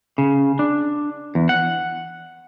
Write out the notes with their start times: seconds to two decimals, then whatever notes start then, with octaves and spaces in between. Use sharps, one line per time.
0.18 C#3
0.59 D4
1.35 E2
1.49 F#5